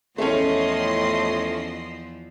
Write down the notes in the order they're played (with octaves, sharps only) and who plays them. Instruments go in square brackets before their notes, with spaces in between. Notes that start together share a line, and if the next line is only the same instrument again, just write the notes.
[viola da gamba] E2 F3 [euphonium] A2 [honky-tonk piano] A3 C#4 [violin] D#5 C6